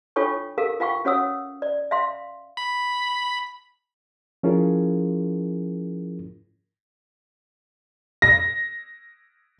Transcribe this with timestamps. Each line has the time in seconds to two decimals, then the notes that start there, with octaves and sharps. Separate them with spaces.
0.16 D4 F4 A4 C#5 G5 C#6
0.58 G4 A4 A#4 F5
0.80 F4 F5 G5 C#6
1.05 C#4 F#4 C#5 F#5 D#6 E6
1.62 D5
1.91 E5 F5 C6
2.57 B5
4.43 F3 C#4 E4 F4 G#4 A#4
8.22 A#6